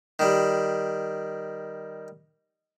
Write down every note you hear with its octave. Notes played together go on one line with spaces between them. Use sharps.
D#3 G3